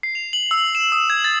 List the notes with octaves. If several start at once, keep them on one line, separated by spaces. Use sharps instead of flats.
C7
F7
F#7
E6
E7
D#6
G#6
A6